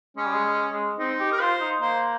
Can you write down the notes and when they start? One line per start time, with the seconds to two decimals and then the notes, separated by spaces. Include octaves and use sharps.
0.17 G#3 C#4
0.26 G3
0.33 G#3
0.45 G#3
0.72 G#3
0.99 C4 D#4
1.20 G4
1.32 A#4
1.40 F4 C5
1.61 D#4
1.81 A#3 C5